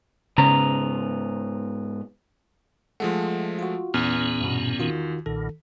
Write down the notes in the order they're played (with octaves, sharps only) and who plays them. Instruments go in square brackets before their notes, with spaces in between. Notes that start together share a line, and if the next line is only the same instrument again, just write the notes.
[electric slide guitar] G#2 B3 A#5 [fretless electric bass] C#3
[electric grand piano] F3 G#3 A3 [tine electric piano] F#5
[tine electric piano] F4 F#4
[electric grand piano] E2 [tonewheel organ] A#2 B3 C#4 [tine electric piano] F6
[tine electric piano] G2 B2
D#3 F4 F#4
[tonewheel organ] B1 A#2 [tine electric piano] D#3 A4